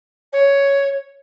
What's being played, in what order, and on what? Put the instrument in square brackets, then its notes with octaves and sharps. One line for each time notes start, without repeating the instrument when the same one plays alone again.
[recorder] C#5